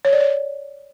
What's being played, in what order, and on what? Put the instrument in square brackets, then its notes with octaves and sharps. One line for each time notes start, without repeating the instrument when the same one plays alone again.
[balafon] C#5
D5
C#5